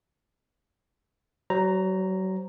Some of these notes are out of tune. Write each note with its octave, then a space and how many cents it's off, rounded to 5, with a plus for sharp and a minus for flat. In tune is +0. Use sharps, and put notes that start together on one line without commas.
F#3 +35 C5 +0 A#5 +0